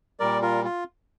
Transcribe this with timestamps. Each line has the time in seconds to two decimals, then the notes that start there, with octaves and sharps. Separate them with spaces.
0.20 A#2 G3 A#4 D5
0.42 F4 A#4
0.64 F4